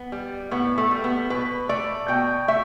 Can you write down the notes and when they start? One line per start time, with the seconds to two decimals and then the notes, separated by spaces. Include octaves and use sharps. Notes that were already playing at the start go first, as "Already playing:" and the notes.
Already playing: B3
0.12 G3
0.51 A2 B3
0.78 A3
0.91 G3
1.04 B3
1.30 B2 B4
1.69 A3 D5
2.08 B2 G5
2.48 A3 E5